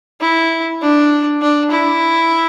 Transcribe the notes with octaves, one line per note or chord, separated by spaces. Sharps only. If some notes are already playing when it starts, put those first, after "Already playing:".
E4
D4
D4
E4